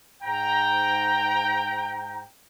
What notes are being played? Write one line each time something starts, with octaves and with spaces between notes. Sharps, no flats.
G#2 G5 A#5